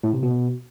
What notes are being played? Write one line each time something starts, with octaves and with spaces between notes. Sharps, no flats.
A2
C3
B2